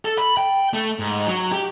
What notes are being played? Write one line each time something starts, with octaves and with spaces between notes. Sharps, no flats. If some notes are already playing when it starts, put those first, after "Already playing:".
A4
B5
G5
A3
G#2
F#3
G4